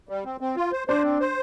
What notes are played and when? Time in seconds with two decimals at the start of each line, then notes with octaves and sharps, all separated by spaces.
0.09 G3
0.25 C4
0.41 C4
0.56 F4
0.72 C5
0.88 D4 C5
1.03 C4
1.20 C5